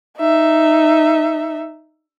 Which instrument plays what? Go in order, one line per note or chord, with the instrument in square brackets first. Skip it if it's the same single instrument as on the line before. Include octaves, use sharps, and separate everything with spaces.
[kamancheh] D#4 E5